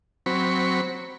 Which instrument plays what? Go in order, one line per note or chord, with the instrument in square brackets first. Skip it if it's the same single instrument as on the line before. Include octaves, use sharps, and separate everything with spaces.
[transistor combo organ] F#3 C4 B5 C#6